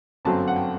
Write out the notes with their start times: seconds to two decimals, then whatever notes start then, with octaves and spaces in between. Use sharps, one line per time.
0.25 G1 F#2 F#3 A3 C4 A5
0.48 F#5
0.56 G5